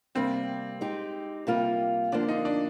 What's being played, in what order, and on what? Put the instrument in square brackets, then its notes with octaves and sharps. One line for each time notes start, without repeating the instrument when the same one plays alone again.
[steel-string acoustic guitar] C3 G3 A#3 [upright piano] C4
[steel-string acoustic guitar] G#3 D#4 G4
C3 G3 A#3 F4
[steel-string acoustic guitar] D3 F3 A#3 [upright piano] D4
[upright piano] D#4
D4